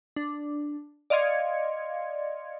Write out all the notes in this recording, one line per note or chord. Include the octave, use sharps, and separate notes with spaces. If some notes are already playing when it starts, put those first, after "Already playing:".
D4
D5 D#5 F5 C6 G#6 C#7